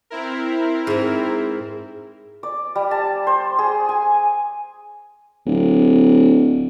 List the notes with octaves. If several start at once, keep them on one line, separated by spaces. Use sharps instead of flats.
C4 E4 A#4
G#2 A#5
D5
G3
A5
C5
G#4
G#5
D1